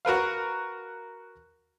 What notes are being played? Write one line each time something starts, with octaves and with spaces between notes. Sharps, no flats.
F#4 A#4 B4 F5